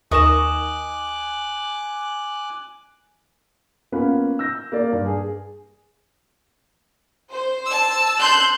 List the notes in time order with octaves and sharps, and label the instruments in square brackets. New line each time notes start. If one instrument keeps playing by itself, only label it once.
[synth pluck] D#2 A#4 E7 [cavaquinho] D#5 C#6 [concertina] G#5 D6 F#6
[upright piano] A#3 B3 C#4 F4 B4 F5
E6 G6 A#6
A#3 D5
G2
G#4
[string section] C5
[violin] A5 E6
[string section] C6 F#6 G6